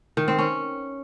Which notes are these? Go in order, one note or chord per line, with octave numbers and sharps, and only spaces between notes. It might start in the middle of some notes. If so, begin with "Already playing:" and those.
D#3
C4
C#4